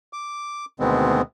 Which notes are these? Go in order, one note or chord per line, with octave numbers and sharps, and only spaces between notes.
D6
D2 B2 D#3 G#3 B3 C4